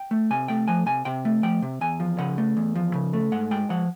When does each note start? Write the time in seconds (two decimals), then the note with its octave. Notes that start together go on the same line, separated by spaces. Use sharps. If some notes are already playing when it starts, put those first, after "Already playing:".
Already playing: G5
0.11 A3
0.31 C3 G#5
0.48 A3 G5
0.68 F3 G#5
0.86 C3 G#5
1.05 C3 G5
1.25 A3
1.43 F3 G5
1.62 C3
1.81 E2 G#5
2.00 F3
2.19 C#3 F#5
2.38 A3
2.57 E2
2.75 F3
2.94 C#3
3.13 A3
3.32 G#2 F#5
3.51 G#3 G5
3.70 F3 F#5